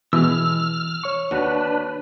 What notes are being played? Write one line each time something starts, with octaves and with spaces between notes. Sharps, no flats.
B2 E3 G#3 E6 F6
C#5 C#6
D#2 D4 F#4 B4